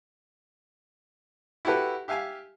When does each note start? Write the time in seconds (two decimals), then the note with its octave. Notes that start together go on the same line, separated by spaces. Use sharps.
1.65 E4 F#4 G4 A4 B4
2.08 G4 E5 F5 G#5 F6